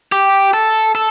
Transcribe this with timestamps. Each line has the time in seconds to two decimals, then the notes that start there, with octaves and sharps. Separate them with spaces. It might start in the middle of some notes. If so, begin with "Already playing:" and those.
0.12 G4
0.54 A4
0.95 A4